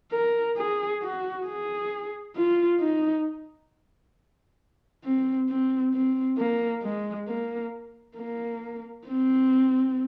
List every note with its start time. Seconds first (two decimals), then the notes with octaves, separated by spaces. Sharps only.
0.11 A#4
0.57 G#4
1.02 F#4
1.46 G#4
2.36 F4
2.80 D#4
5.04 C4
5.49 C4
5.93 C4
6.38 A#3
6.83 G#3
7.28 A#3
8.17 A#3
9.06 C4